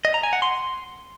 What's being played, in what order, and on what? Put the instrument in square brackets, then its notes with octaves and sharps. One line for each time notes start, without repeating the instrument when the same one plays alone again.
[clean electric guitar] D#5
A#5
G#5
F#5
C6